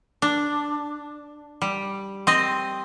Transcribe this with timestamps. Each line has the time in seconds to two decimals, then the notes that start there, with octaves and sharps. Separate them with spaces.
0.22 D4
1.62 G3
2.27 C4 D#5